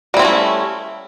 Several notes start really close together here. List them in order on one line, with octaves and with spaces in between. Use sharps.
G3 E4 C4 A3 C#4